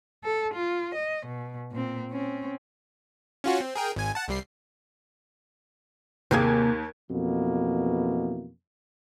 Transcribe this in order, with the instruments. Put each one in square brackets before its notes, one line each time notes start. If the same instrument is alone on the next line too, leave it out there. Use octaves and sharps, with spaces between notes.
[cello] A4
F4
D#5
B2
A#2 C4
C4 C#4
[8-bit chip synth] C#4 F4 F#4
C4
G#4 A#4 G5
G#1 G#5
F#5 A5
C2 G3 C7
[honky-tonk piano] D#2 G#6 [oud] C3 A#3 G#4
[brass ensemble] F2 B2 E3 A#3